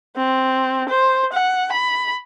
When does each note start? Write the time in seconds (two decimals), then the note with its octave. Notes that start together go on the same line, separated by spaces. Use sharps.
0.16 C4
0.89 C5
1.33 F#5
1.72 B5